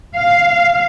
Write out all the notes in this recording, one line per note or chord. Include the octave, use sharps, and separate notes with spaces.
F5
F5